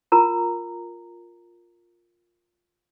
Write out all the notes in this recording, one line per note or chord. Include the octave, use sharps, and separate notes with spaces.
F4 A#4 A#5